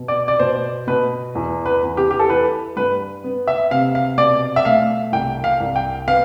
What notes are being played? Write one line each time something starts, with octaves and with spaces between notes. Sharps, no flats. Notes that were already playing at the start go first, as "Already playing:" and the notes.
Already playing: B2
D5
D5
B2 C5
B2 B4
E2
B4
E2
G4
G4
A4
E3 B4
G2 B4
B3
E5
C3 F5
F5
B2 D5
E5
A3 F5
C2 G5
F5
C2
G5
B3 F5